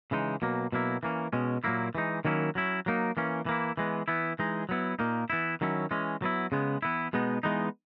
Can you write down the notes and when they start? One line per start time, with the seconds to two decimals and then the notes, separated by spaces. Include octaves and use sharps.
0.11 C#3 E3 G#3 D#4
0.42 B2 F#3 A#3
0.72 B2 F#3 A#3 E4
1.03 E3 A#3 C#4
1.33 B2 G#3 C#4
1.64 A#2 F#3 A#3 E4
1.95 E3 G#3 D#4
2.25 D#3 F#3 A#3 C#4 E4
2.55 F#3 C#4 E4
2.86 F#3 A#3 D#4
3.17 E3 A#3 C#4
3.46 E3 A#3 E4
3.77 E3 G#3 B3
4.08 E3 B3 E4
4.39 E3 G#3 D#4
4.69 F#3 B3 E4
4.99 A#2 A#3 D#4
5.30 E3 B3 E4
5.61 D#3 F#3 C#4 E4
5.91 E3 G#3 C#4
6.22 F#3 B3 E4
6.52 C#3 G#3 B3
6.82 E3 B3 E4
7.13 B2 G#3 B3 D#4
7.43 E3 G#3 B3 D#4